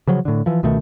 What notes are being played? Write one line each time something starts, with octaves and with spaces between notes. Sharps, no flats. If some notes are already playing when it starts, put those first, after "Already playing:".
C#3 F3 F#3
A2 D3
E3 F3
C#2 B2 D#3 A3